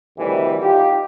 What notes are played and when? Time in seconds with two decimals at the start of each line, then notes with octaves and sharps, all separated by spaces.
0.18 D2 C3 D#3 E3 G3
0.63 D#4 F4 G4